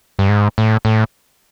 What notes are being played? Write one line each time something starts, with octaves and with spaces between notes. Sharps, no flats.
G2
G#2
A2
A2